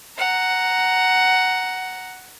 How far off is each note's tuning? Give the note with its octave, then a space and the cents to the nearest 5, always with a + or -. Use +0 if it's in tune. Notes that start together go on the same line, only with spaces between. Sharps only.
F#5 +5 A#5 +0